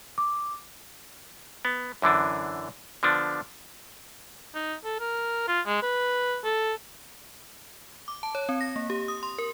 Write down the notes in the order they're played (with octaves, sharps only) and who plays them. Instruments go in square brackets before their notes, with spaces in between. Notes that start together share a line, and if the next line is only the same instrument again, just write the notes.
[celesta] D6
[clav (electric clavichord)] B3
F#2 D3 E3 D4
D3 F3 B3 D4
[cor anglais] D#4
A4
A#4
F4
G#3
B4
A4
[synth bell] D6
A5
C#5
C4
A#6
A#3
G4
D#6
C6
A#4